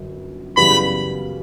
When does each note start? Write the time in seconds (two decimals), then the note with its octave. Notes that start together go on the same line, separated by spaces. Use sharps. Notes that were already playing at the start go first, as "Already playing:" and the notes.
Already playing: G1 F#2
0.57 F#2 C#3 E3 G3 B3 B5